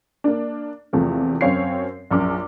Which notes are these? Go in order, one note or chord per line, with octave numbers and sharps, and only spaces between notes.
A#3 D4
E2 C3 F3 A3
F#2 C4 C#5 F5 C7
A#1 F#2 D6 F6